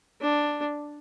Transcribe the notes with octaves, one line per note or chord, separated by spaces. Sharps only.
D4